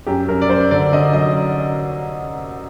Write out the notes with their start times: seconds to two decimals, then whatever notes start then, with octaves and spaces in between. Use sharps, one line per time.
0.06 F#2 G4
0.28 F#2 A#4
0.42 D5
0.49 F#2 C5
0.71 D3 D5
0.92 D3 D#5
1.13 F#3 D#5